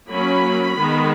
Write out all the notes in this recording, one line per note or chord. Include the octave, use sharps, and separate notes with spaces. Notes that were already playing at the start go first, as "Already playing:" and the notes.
F#3 A#3 C#4 B5
D#3 G#3 B3